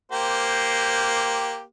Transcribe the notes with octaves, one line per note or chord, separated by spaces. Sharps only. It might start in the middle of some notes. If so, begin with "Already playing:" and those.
A#3 G4 C5